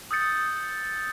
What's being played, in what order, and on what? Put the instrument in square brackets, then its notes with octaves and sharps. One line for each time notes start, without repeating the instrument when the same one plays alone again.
[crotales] D#6 E6 G6 A6 C#7